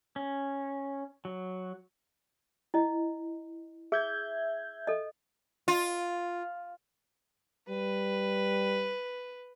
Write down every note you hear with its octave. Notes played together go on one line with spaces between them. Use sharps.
C#4
F#3
E4 D#5
G#4 E5 G6 G#6
A4 D#5
F4
G3 B4